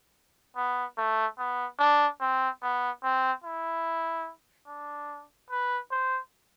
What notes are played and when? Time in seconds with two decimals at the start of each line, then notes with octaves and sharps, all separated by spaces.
0.56 B3
0.97 A3
1.38 B3
1.79 D4
2.21 C4
2.62 B3
3.03 C4
3.44 E4
4.67 D4
5.50 B4
5.91 C5